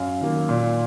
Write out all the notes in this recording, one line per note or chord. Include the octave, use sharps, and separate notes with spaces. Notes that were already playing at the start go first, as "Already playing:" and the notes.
Already playing: F#2 F5
D#3 A#3
A#2